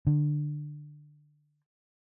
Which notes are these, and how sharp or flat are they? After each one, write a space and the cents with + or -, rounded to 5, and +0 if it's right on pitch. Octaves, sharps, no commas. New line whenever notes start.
D3 +15